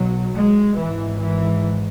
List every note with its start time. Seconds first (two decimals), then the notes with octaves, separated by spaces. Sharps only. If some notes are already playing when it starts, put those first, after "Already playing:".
Already playing: B1 B2 F#3
0.35 G#3
0.76 G#1 G#2 E3
1.19 E3